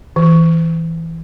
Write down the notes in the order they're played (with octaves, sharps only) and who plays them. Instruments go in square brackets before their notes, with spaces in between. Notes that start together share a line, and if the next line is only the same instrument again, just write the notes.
[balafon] E3